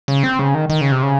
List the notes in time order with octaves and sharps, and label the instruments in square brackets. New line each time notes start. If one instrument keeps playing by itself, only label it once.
[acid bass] C#3
C4
C#3
D#3
D#3
C#3
C3
C#3